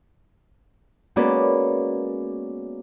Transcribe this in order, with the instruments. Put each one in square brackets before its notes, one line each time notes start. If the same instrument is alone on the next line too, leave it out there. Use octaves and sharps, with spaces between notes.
[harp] G#3 A#3 B3 C#4 F#4 D5